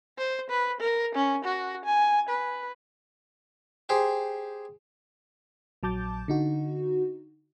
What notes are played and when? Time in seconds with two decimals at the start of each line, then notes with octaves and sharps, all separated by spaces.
0.18 C5
0.50 B4
0.81 A#4
1.15 C#4
1.45 F#4
1.85 G#5
2.30 B4
3.89 G4 G#4 C5
5.83 A#1 F#3 A5 D6 G6 A6
6.28 D3 D#4 F#4